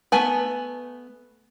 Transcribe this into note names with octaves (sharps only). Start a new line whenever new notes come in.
A3 B3 G#5 B5